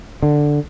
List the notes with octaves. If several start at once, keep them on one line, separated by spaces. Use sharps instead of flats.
D3